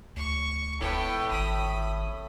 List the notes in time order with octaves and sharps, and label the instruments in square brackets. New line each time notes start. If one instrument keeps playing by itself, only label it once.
[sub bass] D2 [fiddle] C#6
[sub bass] E1 [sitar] A2 [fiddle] B3 G5
[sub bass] G#1 [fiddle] B5 D#6